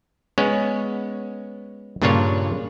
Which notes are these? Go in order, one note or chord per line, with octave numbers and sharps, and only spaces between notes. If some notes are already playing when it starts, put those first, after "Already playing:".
G#3 B3 C#4 C#5
G2 A#2 C#3 D4 F4 C#5